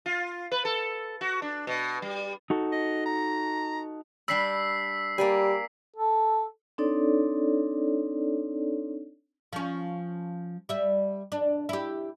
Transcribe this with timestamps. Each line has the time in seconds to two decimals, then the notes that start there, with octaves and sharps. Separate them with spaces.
0.06 F4
0.52 B4
0.65 A4
1.21 F#4
1.42 D4
1.67 B2
2.02 G3
2.50 D#4 F#4 A4
2.72 D#5
3.06 A#5
4.28 G3 D4 B5 E6 B6 C7
5.18 G3 A#3 D5 G#5
5.96 A4
6.78 C4 D4 D#4 A4 C#5 D5
9.53 F3 C#4
10.69 G3 E5
11.32 D4
11.69 E4 G4